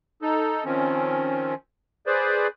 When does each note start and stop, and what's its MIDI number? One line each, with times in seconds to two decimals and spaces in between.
0.22 0.64 63
0.22 0.64 69
0.65 1.54 51
0.65 1.54 53
0.65 1.54 60
0.65 1.54 61
2.07 2.47 68
2.07 2.47 71
2.07 2.47 72
2.07 2.47 74